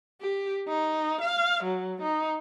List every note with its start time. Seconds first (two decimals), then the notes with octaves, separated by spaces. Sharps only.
0.21 G4
0.68 D#4
1.21 F5
1.63 F#3
2.02 D#4